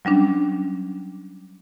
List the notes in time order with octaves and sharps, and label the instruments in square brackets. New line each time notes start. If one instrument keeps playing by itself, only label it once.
[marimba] F#3 G3 C#4 D4